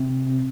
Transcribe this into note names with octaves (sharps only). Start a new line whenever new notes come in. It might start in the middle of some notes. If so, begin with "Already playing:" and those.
Already playing: C3